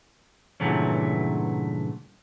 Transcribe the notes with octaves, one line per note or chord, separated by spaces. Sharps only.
G2 A#2 C#3 E3 F#3 A3